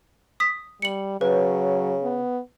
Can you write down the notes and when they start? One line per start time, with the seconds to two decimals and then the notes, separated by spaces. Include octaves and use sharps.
0.40 D#6 B6
0.82 G3 C#7 F#7
1.21 C#3 F#3 B4
2.03 B3